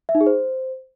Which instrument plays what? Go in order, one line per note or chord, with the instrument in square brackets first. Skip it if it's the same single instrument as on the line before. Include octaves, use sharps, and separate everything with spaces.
[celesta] E5
D#4
G#4
C5